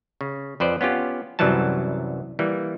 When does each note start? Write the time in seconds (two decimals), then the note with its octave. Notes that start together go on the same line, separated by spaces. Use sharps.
0.21 C#3
0.60 F2 B4 C5 D5
0.81 B3 C#4 F4 G4
1.39 C2 F#2 E3 F#3 G3 A5
2.39 E3 G3 A#3